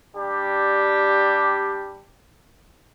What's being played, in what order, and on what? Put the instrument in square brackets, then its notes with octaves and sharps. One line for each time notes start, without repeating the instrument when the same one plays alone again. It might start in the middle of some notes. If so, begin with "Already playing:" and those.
[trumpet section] G3 D4 G4